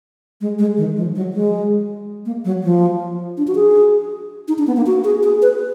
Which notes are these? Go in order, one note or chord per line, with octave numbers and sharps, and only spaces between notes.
G#3
G#3
D#3
F3
F#3
G#3
A#3
F#3
F3
D4
F#4
G#4
D#4
D4
B3
A#3
F#4
G#4
G#4
B4